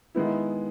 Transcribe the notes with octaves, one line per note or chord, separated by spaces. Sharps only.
D#3 G#3 B3 E4